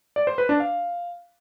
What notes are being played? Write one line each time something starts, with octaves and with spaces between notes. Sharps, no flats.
D5
C5
B4
D4
F5